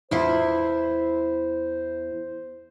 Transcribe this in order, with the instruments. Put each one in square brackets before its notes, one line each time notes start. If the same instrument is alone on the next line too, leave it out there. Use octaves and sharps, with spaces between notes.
[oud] E2 E4 F4 [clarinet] C5